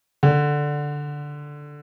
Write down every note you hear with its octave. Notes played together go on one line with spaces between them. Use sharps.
D3